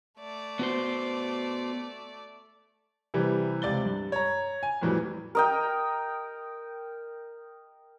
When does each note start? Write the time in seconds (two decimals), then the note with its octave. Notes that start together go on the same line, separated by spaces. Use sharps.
0.19 A3 D5
0.59 B3 F#4 C5
3.14 C3 E3 G3
3.62 C#2 C3 D5 A6 G7
3.85 G2
4.12 C#5 A#5
4.63 G#5
4.81 F2 A2 E3 F#3 G3
5.35 A#4 D#5 G5